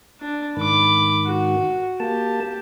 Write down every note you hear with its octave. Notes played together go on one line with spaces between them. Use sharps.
D4
G#2 D#3 B5 D6
F#4
A#3 G4 A5